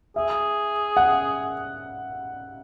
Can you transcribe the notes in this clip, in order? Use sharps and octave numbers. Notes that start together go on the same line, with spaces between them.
G#4 E5
F#5